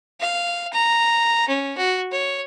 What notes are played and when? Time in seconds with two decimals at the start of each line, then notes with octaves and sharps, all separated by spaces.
0.20 F5
0.73 A#5
1.48 C#4
1.77 F#4
2.12 C#5